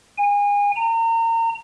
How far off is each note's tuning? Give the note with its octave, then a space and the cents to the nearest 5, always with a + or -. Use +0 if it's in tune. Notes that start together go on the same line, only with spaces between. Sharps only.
G#5 -30
A#5 -35